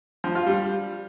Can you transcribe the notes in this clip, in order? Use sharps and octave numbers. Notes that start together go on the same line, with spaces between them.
F3
F4
G3